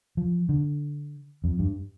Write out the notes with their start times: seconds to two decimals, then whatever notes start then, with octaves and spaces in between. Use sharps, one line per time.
0.17 F3
0.49 D3
1.44 F2
1.59 G2